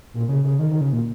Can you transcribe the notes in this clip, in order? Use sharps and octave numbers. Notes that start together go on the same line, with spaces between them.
A#2
C#3
C#3
D#3
D#3
C#3
A#2